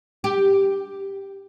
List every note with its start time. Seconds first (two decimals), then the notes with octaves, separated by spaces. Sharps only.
0.24 G4